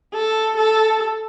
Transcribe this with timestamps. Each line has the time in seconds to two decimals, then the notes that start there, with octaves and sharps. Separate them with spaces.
0.13 A4
0.57 A4